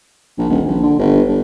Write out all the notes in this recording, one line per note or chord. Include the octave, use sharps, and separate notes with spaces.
A#1
D#1
A#1
D3
G1
G1